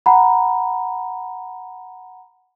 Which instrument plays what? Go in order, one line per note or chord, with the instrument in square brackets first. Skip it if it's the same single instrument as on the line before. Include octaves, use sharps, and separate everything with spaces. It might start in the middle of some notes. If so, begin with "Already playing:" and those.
[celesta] F#5 A#5 B5